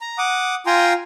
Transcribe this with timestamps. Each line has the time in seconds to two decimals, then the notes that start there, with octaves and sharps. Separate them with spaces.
0.01 A#5
0.18 F#5 D6 D#6
0.66 F4 G5 G#5 A#5 C6